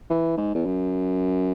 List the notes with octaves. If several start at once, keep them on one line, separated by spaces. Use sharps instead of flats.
E3
G#2
E2
F#2